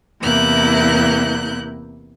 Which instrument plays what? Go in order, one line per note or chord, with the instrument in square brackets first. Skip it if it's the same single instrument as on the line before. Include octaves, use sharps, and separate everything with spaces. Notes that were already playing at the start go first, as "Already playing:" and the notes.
[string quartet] E2 C3 A#3 E4 F#6 G6